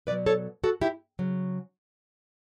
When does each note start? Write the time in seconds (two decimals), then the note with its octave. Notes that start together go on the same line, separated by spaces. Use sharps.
0.07 B2 B4 D5
0.11 F#3
0.26 A4 C#5
0.64 F#4 A4
0.81 E4 G4
1.19 C#3 F#3